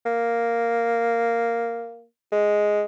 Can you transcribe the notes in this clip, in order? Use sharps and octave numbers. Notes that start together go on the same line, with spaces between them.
A#3
G#3